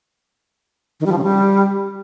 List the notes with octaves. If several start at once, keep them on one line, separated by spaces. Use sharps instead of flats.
D#3
G3
F3
C#3
G3